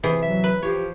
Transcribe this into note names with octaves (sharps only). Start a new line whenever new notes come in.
C3 E3 G#4
F#3 E5
B4
F3 G4 C#5